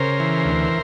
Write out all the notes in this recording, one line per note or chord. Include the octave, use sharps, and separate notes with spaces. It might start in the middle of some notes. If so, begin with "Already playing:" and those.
Already playing: C#3 A#4 C5
E3
D2